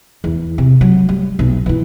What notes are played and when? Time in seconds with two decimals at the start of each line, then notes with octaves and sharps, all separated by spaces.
0.24 E2
0.58 C3
0.81 F#3
1.09 G3
1.39 B1
1.66 E3 E4